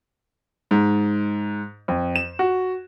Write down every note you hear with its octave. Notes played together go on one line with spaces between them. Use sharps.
G#2
F2
E7
F#4